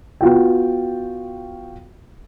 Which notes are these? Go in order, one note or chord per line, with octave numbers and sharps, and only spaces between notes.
B3 F4 F#4 G5